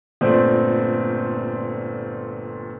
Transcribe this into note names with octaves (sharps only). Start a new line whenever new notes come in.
G1 A#2 A3 C4 C5 D5